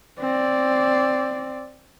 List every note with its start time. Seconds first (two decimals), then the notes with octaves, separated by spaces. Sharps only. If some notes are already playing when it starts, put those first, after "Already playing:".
0.20 C4 D5